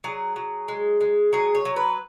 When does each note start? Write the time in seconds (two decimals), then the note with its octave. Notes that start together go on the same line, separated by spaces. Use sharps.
0.04 F#3 G#4
0.36 F#3
0.68 G#3
1.01 G#3
1.33 F#3 G#4
1.55 C#5
1.65 F#3
1.76 B4